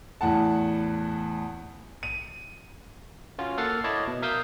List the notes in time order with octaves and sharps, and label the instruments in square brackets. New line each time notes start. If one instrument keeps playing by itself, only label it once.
[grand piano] E2 A2 F#5 A5
D#7
[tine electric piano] C#4 F4 F#4
A#3 A4 F#5 F6 A6 C7
E4 C#5 D#5 A5 B5 D6
B2
A#4 E5 F5 D#6 E6 G6